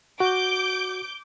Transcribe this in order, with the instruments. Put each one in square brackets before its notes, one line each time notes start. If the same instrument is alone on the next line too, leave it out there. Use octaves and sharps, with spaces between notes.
[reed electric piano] F#4 [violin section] D6 G6 D7